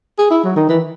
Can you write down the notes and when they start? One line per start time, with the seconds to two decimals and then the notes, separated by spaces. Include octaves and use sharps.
0.18 G#4
0.30 E4
0.44 F#3
0.56 D#3
0.69 E3